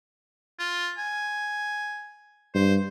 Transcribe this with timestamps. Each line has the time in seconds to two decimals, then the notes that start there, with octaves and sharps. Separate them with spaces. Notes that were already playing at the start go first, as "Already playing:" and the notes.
0.59 F4
0.98 G#5
2.55 G2 C5